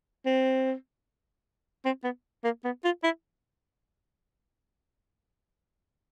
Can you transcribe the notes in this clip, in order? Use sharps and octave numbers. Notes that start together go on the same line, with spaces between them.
C4
C4
B3
A#3
B3
F4
E4